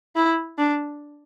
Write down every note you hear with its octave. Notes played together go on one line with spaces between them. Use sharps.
E4
D4